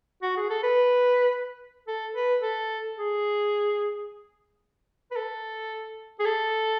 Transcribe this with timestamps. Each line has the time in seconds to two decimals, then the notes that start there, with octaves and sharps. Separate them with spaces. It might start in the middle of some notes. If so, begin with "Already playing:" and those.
0.22 F#4
0.37 G#4
0.50 A4
0.63 B4
1.88 A4
2.15 B4
2.41 A4
2.96 G#4
5.11 B4
5.16 A4
6.20 G#4
6.25 A4